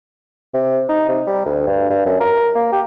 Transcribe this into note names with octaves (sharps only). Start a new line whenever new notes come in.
C3
D#4
C3
G3
D2
G2
G2
F#2
A#4
A#3
G4